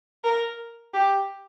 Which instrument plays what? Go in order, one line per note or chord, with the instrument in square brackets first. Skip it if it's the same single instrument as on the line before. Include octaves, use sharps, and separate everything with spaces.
[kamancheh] A#4
G4